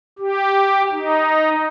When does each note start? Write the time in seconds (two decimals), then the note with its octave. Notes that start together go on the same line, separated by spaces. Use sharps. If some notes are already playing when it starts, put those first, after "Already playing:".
0.19 G4
0.92 D#4